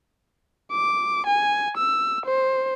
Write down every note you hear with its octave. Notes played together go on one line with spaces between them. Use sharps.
D6
G#5
E6
C5